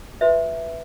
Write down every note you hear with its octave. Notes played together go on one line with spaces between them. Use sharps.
F#4 B4 E5